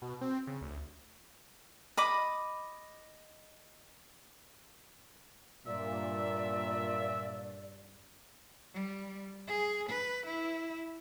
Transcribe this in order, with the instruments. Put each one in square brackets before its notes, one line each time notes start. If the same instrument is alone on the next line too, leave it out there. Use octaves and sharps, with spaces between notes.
[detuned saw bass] B2
C4
C#3
D2
[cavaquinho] D#5 B5 D6
[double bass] G2 [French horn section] A#2 [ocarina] D5 [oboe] E5
[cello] G3
G#4
B4
E4